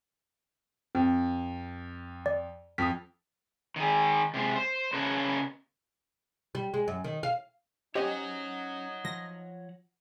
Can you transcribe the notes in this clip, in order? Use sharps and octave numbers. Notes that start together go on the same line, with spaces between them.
F2 C4
D5
F2 D#6 B6
D#3 G#4
C3 G#3 C5
C5
C#3 A#4 B4 C#5 A5
G3
G#3
F#2
D#3
F5
C#4 D#4 G4 C5 C#5 D#5 F#5
F3 A#6